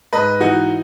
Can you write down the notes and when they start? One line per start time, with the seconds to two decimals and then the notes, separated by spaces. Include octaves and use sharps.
0.13 G#2 B4 D#5
0.40 E3 D#4 F#4